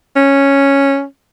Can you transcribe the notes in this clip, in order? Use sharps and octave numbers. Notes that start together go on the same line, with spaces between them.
C#4